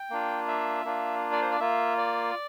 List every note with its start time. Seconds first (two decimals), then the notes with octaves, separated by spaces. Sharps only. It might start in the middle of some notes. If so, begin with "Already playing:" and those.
Already playing: G5
0.10 A#3 D4 F4
0.48 E5
0.85 A#3 D4 F4
1.32 D5
1.41 C5
1.51 D5
1.60 A#3 F4 E5
1.98 D5